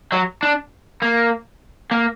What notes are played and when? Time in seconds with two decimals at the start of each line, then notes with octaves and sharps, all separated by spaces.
0.12 F#3
0.43 D4
1.02 A#3
1.91 A#3